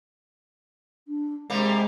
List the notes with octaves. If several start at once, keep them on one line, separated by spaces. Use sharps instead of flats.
D4
C3 G3 G#3 A#3